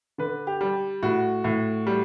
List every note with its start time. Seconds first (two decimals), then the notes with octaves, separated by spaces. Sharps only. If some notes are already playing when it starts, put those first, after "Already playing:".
0.18 D3 B4
0.47 G4
0.61 G3
1.03 A2 F#4
1.44 A2
1.87 G3